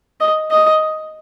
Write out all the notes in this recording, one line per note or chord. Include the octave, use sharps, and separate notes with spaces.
D#5
D#5